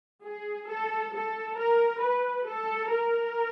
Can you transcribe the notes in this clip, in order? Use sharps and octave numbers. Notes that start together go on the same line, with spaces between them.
G#4
A4
A4
A#4
B4
A4
A#4